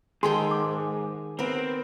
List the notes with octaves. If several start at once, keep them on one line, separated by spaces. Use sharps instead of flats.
G#2 D#3 G#4 A4 G5 C6
D6
B3 C4 A#4